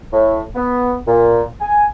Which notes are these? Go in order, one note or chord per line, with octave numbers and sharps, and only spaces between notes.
A2
B3
A#2
G#5